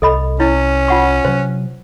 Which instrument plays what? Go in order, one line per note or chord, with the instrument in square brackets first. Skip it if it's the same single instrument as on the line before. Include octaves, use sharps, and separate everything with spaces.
[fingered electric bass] C2 [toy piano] A4 D#5 B5
[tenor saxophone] C#4 [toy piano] E4
[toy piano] F4 F#5 C#6
[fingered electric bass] C3 F#3 [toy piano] C5